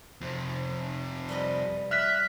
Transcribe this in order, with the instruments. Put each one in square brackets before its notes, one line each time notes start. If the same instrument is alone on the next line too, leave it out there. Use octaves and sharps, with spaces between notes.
[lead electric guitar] F2 C3
[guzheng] G3 B4 D#5
[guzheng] D#5 [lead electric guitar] E5 [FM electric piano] F6 F#6 B6